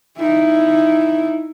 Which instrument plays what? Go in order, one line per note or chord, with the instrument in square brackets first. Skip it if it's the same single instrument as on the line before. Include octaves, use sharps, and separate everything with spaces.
[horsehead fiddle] D#4 E4